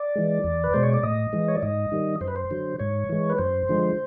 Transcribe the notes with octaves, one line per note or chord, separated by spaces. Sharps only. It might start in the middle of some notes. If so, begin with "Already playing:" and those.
Already playing: D5
E3 G#3
E2
B4
B2 G#3 C5
C#5
D5
A2 D#5
E3 G#3
C#5
D5
G#2 D#5
D#3 G3
F#2 C5
B4
C5
D3 F#3
G#2 C#5
E3 G#3
B4
F#2 C5
D3 F3 G#3